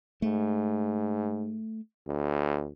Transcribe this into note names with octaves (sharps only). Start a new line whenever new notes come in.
G#2 A3
D2